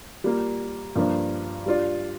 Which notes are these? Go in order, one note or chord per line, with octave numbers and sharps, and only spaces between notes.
G3 A#3 F4
G2 F3 A#3 D4
G3 D4 F4 D5